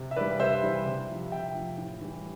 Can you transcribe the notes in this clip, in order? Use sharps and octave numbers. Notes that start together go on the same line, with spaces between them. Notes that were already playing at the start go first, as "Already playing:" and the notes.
Already playing: C3
E5
E3 G3 B4 D5
C3 C5 E5
E3 G3
C3
F3
C3 E5 G5
F3
A2
E3 G3